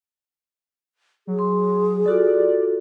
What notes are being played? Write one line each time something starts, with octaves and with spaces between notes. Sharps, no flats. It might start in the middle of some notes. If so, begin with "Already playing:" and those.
F#3 G#4
C6
F4 F#4 A4 D5